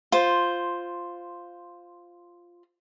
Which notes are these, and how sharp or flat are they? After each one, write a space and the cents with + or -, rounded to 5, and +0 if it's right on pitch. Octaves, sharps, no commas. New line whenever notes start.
F4 +0 C5 +0